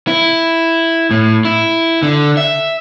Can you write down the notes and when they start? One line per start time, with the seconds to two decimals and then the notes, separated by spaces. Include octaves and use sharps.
0.07 E4
1.11 A2
1.45 E4
2.03 D3
2.37 E5